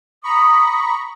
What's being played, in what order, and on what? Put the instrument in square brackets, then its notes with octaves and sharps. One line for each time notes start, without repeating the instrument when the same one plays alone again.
[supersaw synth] A#5 B5 C#6 [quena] D#6